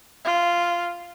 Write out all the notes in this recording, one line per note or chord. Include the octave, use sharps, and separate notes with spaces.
F4